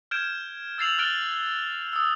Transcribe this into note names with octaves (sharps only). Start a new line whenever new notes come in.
F6 G6 G#6 D7 E7
E6 A6 C7 F7 F#7
F6 F#6 A6 D7 G7
D#6 E6